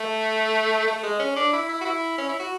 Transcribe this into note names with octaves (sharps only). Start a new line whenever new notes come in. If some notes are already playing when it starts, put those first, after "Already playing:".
Already playing: A3
A3
G#3
C#4
D4
E4
E4
F#4
E4
C#4
E4
F#4